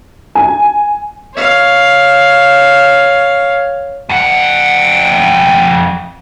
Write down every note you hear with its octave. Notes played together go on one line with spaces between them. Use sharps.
G#5
C#5 F5
F2 F#5